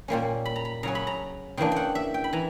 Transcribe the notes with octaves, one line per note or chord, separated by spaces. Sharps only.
A#2 G3 A#3 C#4
B5
A#5
B5
C#3 F#3 C#4 A#5
B5
A#5
C#3 E3 A#3 D4 G5
F#5 G5
E5
G5
B5
E3 A#5